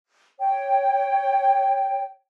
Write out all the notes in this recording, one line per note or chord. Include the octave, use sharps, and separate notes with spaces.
C#5 G5